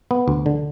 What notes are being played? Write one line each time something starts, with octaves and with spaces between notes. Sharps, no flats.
B3
D2
D3